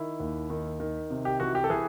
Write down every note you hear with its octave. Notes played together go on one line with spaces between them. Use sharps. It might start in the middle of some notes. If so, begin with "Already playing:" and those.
Already playing: D#3 E4
D#2
D#3
D#3
C3
G4
E3 F#4
G4
A4
E3 G#4